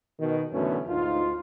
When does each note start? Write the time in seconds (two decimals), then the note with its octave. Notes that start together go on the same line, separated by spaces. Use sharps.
0.20 B2 D#3
0.52 F#2 B2 D3 E3 A3 C#4
0.88 D2 G#2 D#4 F4